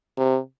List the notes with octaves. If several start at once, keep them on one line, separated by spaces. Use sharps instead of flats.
C3